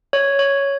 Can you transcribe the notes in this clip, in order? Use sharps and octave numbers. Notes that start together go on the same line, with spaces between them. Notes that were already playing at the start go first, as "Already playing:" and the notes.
C#5
C#5